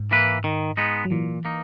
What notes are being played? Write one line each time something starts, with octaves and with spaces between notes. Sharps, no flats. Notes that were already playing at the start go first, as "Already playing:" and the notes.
Already playing: G#2
E3 A#3 E4 B4
D#3
G#3 B3 D#4
F#3
A#2 E3
A#3 D#4